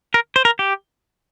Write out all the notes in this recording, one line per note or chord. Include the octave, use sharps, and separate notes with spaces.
A#4
C5
A#4
G4